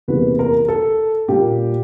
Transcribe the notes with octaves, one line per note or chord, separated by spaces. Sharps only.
E2 C3 E3 G3 A#3 B4
A#4
A4
A#2 G3 A#3 G4